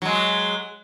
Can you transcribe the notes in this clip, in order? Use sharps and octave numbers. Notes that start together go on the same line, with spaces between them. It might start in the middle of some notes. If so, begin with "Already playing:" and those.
F#3 G#3